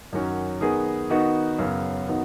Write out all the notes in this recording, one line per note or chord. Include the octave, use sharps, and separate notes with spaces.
F#2 D#3 F#3 C#4 F#4
D#3 B3 G#4
D#3 B3 D#4 F#4
F#2 C#3 B3
D#3 F#3 B3 D#4